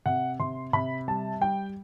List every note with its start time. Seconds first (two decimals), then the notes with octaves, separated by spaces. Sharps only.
0.06 C3 F#5
0.40 C3 C6
0.73 C3 B5
1.08 G3 A5
1.41 G3 G5